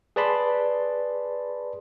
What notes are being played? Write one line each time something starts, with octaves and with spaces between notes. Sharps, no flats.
G#4 B4 D5 A5 B5 C6